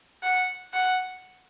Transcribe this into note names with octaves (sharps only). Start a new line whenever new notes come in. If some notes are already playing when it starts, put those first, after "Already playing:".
F#5
F#5